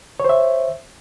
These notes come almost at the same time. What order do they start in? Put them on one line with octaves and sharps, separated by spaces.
C#5 C5 E5